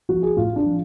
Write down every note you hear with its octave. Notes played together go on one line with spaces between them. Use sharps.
F3 F#4
G#4
A2 F4
D4
F3